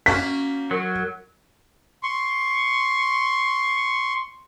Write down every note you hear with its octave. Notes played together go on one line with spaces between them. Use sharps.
A#3 C#4 F#4 B6
F#3 A#4
C6 C#6